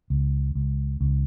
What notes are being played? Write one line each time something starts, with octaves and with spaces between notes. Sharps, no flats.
C#2
C#2
C#2